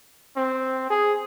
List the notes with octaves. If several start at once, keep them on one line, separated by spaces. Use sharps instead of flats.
C4
G#4